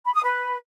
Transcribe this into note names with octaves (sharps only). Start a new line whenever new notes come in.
B5
D#6
B4